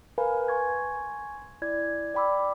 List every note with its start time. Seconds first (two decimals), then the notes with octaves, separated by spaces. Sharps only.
0.18 A#4 B4 F5 G#5 B5
0.48 G#5 C6 C#6 G#6
1.62 E4 D5 G#6
2.14 D5 G5 B5 D6 E6